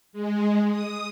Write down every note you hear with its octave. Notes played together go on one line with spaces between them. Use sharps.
G#3
D#6